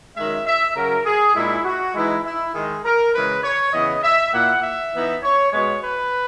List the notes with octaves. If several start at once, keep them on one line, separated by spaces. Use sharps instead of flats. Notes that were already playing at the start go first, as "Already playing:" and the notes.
F#2 D#3 G#3 E5
E5
F#2 C#3 F#3 A#4
G#4
A#2 G#3 D#4 E4
F#4
E3 G#3 D#4 E4
E4
D#3 G#3 D#4 G#4
A#4
C#3 E3 G#3 B4
C#5
C#3 E3 B3 E4 D#5
E5
A#2 A#3 E4 F#5
E5
E3 B3 D#4
C#5
B2 G#3 B3 C#5
B4